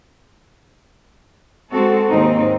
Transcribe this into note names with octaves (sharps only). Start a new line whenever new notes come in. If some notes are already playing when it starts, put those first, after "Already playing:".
G#3 C4 F#4 A4
D#2 G#2 C4 D#4